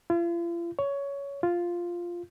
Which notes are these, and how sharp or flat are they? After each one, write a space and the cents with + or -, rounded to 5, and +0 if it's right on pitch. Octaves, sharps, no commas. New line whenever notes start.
F4 -45
C#5 +15
F4 -5